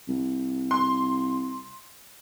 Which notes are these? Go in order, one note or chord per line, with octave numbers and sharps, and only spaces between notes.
C2
C6